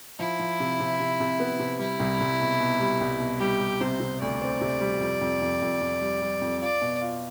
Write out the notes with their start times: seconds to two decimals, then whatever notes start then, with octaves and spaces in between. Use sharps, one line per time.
0.19 F3 E4
0.40 F3
0.60 C3
0.80 C3
1.00 C3
1.20 C3
1.40 B3
1.59 C3
1.79 G3 E4
2.00 C2
2.20 C2
2.41 B2
2.60 B2
2.80 G3
3.01 C2
3.20 B2
3.40 G3 G4
3.60 G3
3.81 C3 C5
4.00 C3
4.21 D2 D5
4.41 C4
4.61 C3
4.81 G3
5.00 F2
5.21 F2
5.42 F2
5.62 F2
5.81 F2
6.02 G3
6.22 G3
6.41 F2
6.61 F4 D5
6.82 B2
7.01 F4